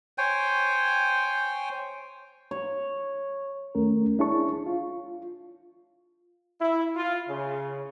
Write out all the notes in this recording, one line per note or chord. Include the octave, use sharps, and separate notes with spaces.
C5 C#5 G5 G#5
C#5
D#2 A3 C#4 A#4
D4 E4 G#4 C#5 A5 C#6
F4
E4
F4
C#3